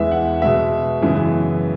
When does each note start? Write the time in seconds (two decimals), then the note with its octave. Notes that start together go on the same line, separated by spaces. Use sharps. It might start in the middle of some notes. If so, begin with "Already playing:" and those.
Already playing: E2 E3 G#3 E5
0.11 F#5
0.41 B2 G#3 B3 E5
1.01 F#2 C#3 E3 G#3 B3